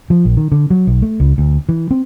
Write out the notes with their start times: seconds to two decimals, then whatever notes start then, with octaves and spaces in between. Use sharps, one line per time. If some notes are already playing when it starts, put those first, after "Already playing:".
0.10 F3
0.25 A#1
0.37 D#3
0.52 D3
0.70 F#3
0.87 B1
1.02 A3
1.20 C#2
1.38 D2
1.69 E3
1.91 C4